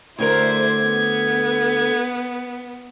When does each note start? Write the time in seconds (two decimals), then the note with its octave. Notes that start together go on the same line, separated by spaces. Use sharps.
0.18 D2 D3 E4 A#4 C5 G#6
0.83 B3